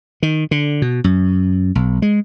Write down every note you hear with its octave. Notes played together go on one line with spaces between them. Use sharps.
D#3
D3
B2
F#2
B1
G#3